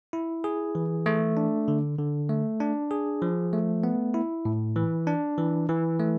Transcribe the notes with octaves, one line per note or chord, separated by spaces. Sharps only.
E4
G#4
E3
A3
D4
D3
D3
A3
D4
G#4
F3
A3
B3
E4
A2
E3
D4
E3
E3
A3